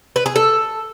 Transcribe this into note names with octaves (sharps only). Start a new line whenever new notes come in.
B4
G#4
A4